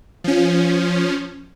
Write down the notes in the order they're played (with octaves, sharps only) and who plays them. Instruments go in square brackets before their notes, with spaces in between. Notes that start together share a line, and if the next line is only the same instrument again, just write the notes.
[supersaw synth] F3 C#4